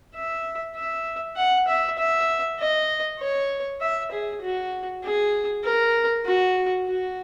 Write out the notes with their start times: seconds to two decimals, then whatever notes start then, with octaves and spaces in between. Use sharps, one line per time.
0.15 E5
0.76 E5
1.36 F#5
1.67 E5
1.98 E5
2.59 D#5
3.19 C#5
3.81 E5
4.11 G#4
4.42 F#4
5.03 G#4
5.64 A#4
6.25 F#4
6.87 F#4